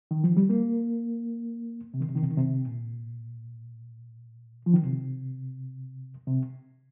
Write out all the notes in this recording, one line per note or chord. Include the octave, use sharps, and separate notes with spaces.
D#3
F3
G3
A#3
C3
D#3
C3
D#3
C3
D#3
C3
A#2
F3
D#3
C3
C3